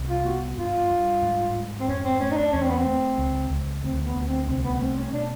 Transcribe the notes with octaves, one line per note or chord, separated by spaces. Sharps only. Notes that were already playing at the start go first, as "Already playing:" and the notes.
Already playing: C2
F4
B3 F#4
G2 F4
G2
G#2
G#2
C4
F2 C#4
C4
A3 C#4
D#4
D4
E2 C#4
C4
B3
C4
A3
C#2
C#2
D2 C4
B3
D2
C4
C2 C4
B3
B3
A3 C4
C#4
B2 D4